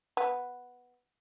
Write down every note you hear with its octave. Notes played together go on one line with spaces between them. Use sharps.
B3